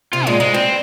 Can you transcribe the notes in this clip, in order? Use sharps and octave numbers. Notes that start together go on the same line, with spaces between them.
C3 F4
A#2 G#3
G#2 G#3
G2 C4